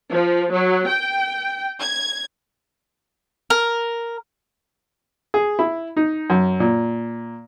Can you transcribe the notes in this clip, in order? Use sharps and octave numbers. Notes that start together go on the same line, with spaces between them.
F3
F#3
G5
G#6
A#4
G#4
E4
D#4
F#2
A#2